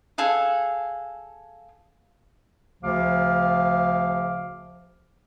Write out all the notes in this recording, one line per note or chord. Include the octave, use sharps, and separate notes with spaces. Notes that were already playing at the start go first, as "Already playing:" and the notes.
G#4 A4 F5 F#5
D2 C#3 F3 F5 D6